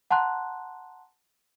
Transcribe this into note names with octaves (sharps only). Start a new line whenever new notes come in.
F#5 A5 A#5 C6 F#6